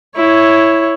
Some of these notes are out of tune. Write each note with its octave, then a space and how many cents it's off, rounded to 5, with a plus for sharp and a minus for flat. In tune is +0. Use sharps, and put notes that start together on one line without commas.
E4 +0 C#5 +0